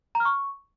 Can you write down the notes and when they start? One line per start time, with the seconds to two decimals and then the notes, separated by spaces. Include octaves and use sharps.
0.15 A#5
0.20 F6
0.25 C#6